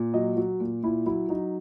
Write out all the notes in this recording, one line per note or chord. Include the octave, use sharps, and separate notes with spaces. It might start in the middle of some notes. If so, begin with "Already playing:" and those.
Already playing: A#2
F#3 D#5
F#3
A#2
A#2 E4
F#3 E4
F#3 D#4